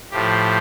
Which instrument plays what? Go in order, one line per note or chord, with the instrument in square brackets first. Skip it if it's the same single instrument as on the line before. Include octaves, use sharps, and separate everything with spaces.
[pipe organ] A2 F3 G4